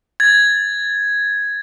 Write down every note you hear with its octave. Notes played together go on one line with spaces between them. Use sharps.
G#6 A6